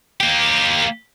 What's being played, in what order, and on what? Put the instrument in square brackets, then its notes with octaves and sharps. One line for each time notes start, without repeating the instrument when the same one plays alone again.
[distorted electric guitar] A#3 G4